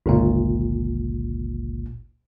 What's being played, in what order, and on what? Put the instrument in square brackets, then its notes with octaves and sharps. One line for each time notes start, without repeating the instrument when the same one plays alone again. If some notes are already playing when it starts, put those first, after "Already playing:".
[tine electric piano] G1 C#2 A#2